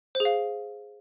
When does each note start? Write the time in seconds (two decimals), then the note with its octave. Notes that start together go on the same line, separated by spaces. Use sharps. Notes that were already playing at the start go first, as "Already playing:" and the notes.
0.15 C5
0.20 G#4
0.25 F5